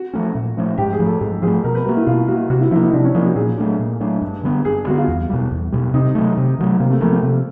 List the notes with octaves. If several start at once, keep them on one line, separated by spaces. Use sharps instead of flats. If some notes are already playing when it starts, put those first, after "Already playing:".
Already playing: F#4
F3 A3 C#4
A#2
F3 A3 C#4
G#2 G4
G#4
F3 A3
A4
G#2 G#4
F3 A3 G#4
B2 A#4
B4
G3 A#3 F#4
E4
B2 F4
G3 A#3 F#4
C3 F#4
E4
F3 A#3 E4
D#4
C3 D4
C#4
F3 A#3 D#4
F#4
A#2 G#4
F#3 A3 D4
A#2
F#3 A3 D4
G2
D3 G3 B3
G2 G#4
D3 G3 B3 F#4
F4
E2
B2 G3
E2
B2 G3
C3 D#4
D#3 F#3 A3
C3
D#3 F#3 A3
C3 A#3
A3
F3 A3 A#3
A3
C3